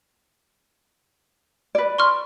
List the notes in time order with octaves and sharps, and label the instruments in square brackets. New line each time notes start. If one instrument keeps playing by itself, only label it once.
[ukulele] B4 D5
[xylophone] C6 C#6 F6